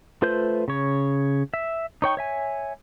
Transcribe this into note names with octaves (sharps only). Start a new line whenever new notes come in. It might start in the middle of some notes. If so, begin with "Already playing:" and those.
A3 F4 B4 C5 G6
C#3 C#5
E5
D#4 C#5 G5 C#6
C#5 E5 G#5